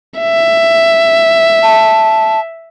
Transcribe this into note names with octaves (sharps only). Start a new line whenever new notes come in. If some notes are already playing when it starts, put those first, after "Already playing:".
E5
A5